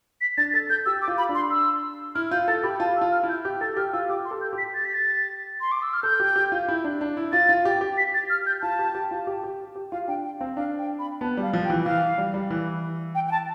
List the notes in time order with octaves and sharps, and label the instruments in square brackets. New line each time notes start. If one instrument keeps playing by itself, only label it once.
[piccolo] B6
[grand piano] D4 [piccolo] A6
[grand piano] A4 [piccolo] A6
[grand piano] A4 [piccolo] G6
[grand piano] G4 [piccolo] E6
[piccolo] D6
[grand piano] F4
[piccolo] B5
[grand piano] D4
[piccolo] C6
E6
[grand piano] E4 [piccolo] F6
[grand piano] F4 [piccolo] G6
[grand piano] A4 [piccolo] A6
[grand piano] G4 [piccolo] B5
[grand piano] F4 [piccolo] A5
[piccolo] E6
[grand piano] F4
[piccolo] F6
[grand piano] E4
[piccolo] G6
[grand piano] G4 [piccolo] G6
[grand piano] A4 [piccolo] A6
[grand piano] G4 [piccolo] F6
[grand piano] F4 [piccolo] E6
[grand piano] G4 [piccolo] D6
[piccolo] C6
[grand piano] A4
[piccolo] G6
[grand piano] G4
[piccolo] B6
A6
B6
A6
C6
D6
E6
F6
[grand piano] A4 [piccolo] G6
[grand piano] G4
G4
F4
E4
D4
D4
E4
[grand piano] F4 [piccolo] A6
[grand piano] F4
G4
G4
[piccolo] B6
A6
F6
G6
[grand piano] F4 [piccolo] A5
[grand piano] G4
G4
F4
G4
G4
G4
[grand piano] F4 [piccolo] F5
[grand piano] D4 [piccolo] G5
[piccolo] G5
[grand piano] C4 [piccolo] F5
[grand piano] D4 [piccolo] F5
[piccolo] G5
B5
[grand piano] B3 [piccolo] A5
[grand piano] G3
[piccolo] F5
[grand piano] F3
[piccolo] G5
[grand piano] E3
[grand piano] E3 [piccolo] F5
[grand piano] G3
G3
E3
[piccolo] G5
G5
A5